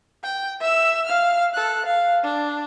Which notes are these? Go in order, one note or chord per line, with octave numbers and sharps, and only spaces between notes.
G5
E5 E6
F5 F6
A4 F#6
F5
D4